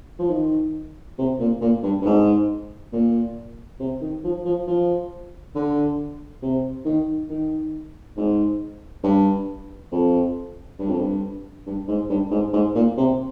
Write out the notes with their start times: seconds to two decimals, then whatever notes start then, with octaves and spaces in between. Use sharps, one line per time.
0.19 F3
0.30 D#3
1.18 C3
1.39 A#2
1.61 A#2
1.83 G2
2.02 G2
2.05 G#2
2.93 A#2
3.80 C3
4.01 D#3
4.24 F3
4.45 F3
4.67 F3
5.55 D3
6.42 C3
6.85 D#3
7.30 D#3
8.17 G#2
9.04 G2
9.92 F2
10.79 G2
10.88 F2
10.99 G2
11.67 G2
11.88 G#2
12.09 G2
12.31 G#2
12.53 G#2
12.75 A#2
12.98 C3